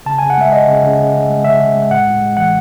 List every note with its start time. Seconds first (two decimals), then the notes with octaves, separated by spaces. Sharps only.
0.06 C#3 A5
0.19 G#5
0.22 C#3
0.30 F#5
0.38 G#3 E5
0.52 C#3 D#5
0.68 C#3
0.83 C#3
0.99 C#3
1.15 C#3
1.29 G#3
1.44 C#3 E5
1.60 C#3
1.75 G#3
1.91 A2 F#5
2.06 A2
2.22 G#3
2.37 E3 F#5